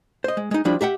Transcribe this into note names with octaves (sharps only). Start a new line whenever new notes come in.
C5 D#5
G#3
G#3 D#4
F3 G3 D4 E4
G4 E5 F#5 G5